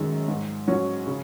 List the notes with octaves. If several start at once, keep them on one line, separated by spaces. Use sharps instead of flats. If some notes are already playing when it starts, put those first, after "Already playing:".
Already playing: F#2 D#3 G#3
G#2
F#3 C#4
C#3